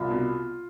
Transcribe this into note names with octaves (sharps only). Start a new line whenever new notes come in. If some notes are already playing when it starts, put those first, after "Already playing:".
Already playing: C2 F4
B2